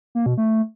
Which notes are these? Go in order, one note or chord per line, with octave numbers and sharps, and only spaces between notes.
A#3
B2
A3